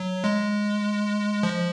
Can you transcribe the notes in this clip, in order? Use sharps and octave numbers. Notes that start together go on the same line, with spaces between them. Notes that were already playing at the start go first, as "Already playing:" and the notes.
Already playing: F#3
G#3
F3